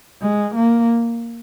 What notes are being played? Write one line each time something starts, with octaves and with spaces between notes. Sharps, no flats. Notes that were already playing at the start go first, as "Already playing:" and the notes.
G#3
A#3